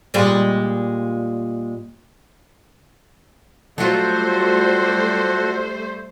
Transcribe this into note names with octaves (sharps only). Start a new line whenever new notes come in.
A#2 G3 G#3
F#3 G3 A3 F4 F#4 A4 C5